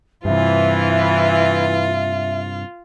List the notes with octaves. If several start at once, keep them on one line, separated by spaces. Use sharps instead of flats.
G2 C3 E3 F4 E5